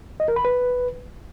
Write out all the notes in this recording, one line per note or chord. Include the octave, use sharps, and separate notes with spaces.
D#5
A#4
B5
B4